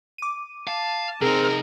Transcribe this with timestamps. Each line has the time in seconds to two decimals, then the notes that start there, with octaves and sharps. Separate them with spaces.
0.18 D6 D#7
0.67 F5 A5
1.22 C3 C4 D#4 G#4 A#4